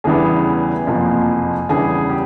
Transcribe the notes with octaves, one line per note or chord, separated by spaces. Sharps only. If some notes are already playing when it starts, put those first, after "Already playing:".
E2 C#3 E3 G3 B3 G#4
F#1 F2 C3 F3 A#3
E2 C#3 E3 G3 B3 G#4
G4